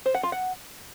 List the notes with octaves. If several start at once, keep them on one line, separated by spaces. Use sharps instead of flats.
C5
F#5
F4
F#5